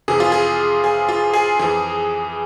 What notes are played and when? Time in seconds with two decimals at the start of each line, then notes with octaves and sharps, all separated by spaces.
0.08 F2 C3 E3 G#4
0.20 F4
0.32 G#4
0.84 G#4
1.09 F4
1.34 G#4
1.59 F2 E3 G#4